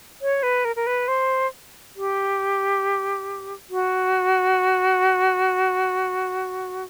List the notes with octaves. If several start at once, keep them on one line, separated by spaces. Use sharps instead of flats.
C#5
B4
A#4
A#4
B4
C5
G4
F#4